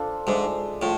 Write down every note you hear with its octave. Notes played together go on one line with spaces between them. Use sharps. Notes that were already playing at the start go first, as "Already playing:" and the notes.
Already playing: D4 F4 A4 C5
G#2 G#3 D4 A4 E5
A2 F3